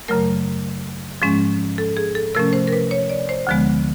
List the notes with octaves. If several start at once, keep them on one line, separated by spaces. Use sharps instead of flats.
F#2 C#3 F#3 A3 A#4
G#2 F3 G#3 C#4
A4
G#4
A4
C3 F3 A3 C#4 A#4
C5
A#4
B4
C#5
D5
C5
D2 D3 F3 G#3 B3